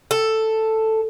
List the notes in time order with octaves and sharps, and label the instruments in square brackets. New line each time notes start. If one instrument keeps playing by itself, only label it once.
[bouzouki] A4